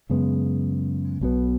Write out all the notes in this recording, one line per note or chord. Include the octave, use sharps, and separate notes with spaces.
F#2 C#3 G#3 B3
B1 B2 B3